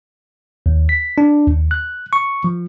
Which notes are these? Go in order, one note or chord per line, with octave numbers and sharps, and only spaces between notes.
D#2
B6
D4
D#2
F#6
C#6
F3